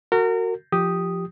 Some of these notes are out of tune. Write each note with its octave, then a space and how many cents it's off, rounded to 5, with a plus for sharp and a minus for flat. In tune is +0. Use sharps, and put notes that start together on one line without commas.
F#4 +0 A#4 -30
F3 +0 G4 +0 D#6 +0